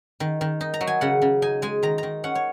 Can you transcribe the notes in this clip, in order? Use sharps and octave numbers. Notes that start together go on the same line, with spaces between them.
D#3
D#3
D#4
A#5
F#3
G#5
C#3 F#5
C#3
D#4 G#5
G#3 G#5
D#3 A#5
D#3 A#5
C#4 F#5
C#5